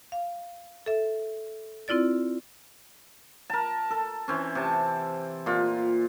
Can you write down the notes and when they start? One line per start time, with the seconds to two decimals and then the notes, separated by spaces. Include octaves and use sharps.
0.12 F5
0.86 A4 E5
1.88 C4 E4 F4 D5 A6
3.50 A#4 A5
3.91 A4
4.28 E3 C4 C#4
4.55 C3 A5
5.46 A#2 F4